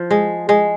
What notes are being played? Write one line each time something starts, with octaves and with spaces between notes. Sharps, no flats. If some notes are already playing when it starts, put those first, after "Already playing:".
Already playing: F3
G#3
G#3